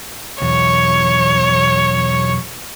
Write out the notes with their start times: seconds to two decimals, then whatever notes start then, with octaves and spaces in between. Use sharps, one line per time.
0.42 B1 E2 C#5